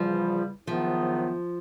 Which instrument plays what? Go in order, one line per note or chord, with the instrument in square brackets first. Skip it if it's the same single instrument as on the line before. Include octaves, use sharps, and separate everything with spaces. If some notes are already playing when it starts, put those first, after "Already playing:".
Already playing: [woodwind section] E2 C#3 E3 G3 [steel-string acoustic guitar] F3
[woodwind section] G#2 D#3 F#3 B3 E4 [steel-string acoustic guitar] F3